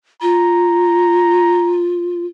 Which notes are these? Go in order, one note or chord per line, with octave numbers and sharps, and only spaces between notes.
F4 A#5